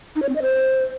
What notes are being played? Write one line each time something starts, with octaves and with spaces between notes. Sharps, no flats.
D#4
C#5
C4
D#5
C5